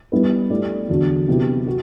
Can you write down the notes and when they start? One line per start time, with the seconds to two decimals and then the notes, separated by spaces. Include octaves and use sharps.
0.12 G3 B3 E4 B4
0.50 A3 E4 G4 D5
0.89 E2 D3 F#3
1.28 C3 F#3 B3 E4 G4
1.67 F#4